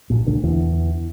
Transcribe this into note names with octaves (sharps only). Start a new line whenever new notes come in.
A#1 A#2
D2 D3
E2 E3